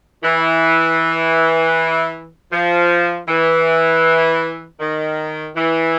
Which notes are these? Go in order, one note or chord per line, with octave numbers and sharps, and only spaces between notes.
E3
F3
E3
D#3
E3